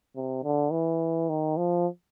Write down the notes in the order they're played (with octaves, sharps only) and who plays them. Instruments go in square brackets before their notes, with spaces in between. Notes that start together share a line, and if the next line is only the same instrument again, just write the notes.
[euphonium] C3
D3
E3
D#3
F3